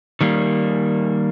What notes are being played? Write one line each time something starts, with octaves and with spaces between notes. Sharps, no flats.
D#3 G3 A#3